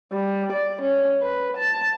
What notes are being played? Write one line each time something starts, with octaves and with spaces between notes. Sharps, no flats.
G3
D5
C#4
B4
A5